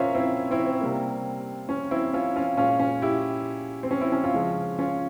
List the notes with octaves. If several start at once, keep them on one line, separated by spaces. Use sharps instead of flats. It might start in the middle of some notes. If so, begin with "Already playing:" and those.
Already playing: A#2 C#4 F4 A#4 C5 C#5 E5
C4 E4
C4 E4
C4
C3 G3 A#3
C#4
C4 E4
C#4 F4
C#4 F4
A#2 G#3 C#4 F4
C#4
E4 G4
C4
C#4
C4 E4
C#4
C#4 F4
C#3 F3 G#3
C#4 F4